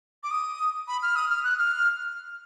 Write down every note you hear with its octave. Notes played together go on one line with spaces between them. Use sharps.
D6
D#6
B5
F6
D#6
F6
F#6
F6